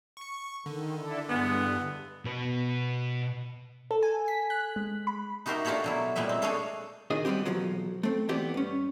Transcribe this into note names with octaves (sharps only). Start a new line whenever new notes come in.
C#6 C#7
D3 D#3
D4 E4 A4
G2 E3 G#3 B3
B2 B4
A4
G#5
B6
F#6
G#3
B5
D#4 F#4 G4 A#4 C5 E5
D4 F4 G4 A4 C#5 F#5
B2 F#3 E4
A#2 G3 G#3 A#3 E5
C4
A3 D4 G#4 A4 C#5 F5
A#2 D#3 D4 G#4 D#5
G3 G#3 B3 C4 G4
B1 E2 F3 F#3
A3 C4
E3 B3 C4 G4 D5
G2 C#4